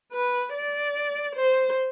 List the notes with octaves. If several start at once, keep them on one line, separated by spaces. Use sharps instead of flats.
B4
D5
C5